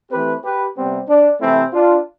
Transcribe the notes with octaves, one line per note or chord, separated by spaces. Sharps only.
E3 A3 C4 G4 B4
G4 B4
C3 G3 B3 C4
D4
C3 E3 A3 C4 E4
D4 F4